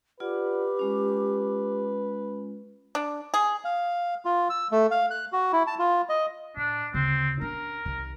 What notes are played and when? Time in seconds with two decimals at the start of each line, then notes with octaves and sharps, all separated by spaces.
0.20 F4 G4 B4 D5 F#5
0.77 G#3 C#4 F4
2.95 D4
3.34 G#4
3.65 F5
4.25 F4
4.50 E6
4.72 A3
4.91 F5
5.10 F#6
5.32 F#4
5.53 E4
5.67 A5
5.79 F4
6.09 D#5
6.57 A2 D4
6.94 D2 C#3 C4
7.41 C#4 D4 A#4
7.85 C2 D#3